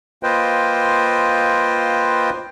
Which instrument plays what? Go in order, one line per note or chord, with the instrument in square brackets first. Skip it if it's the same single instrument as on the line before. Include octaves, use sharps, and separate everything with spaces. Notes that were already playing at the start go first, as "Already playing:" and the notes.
[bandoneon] A#3 F4 B4 C5 D#5 G5